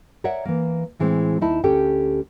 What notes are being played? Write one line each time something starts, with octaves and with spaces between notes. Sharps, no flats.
A#4 C#5 D5 E5 F#5
E3 A#3
A2 E3 G#3 C4
D#2 D#4 E4 A5
D2 C#4 G4 A4 G5